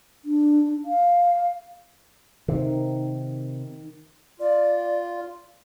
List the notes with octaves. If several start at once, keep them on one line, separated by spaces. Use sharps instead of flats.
D4
F5
C3 D#3
F4 D5